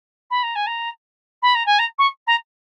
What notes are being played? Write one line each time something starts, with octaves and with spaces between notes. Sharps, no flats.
B5
A#5
G#5
A#5
B5
A#5
G#5
A#5
C#6
A#5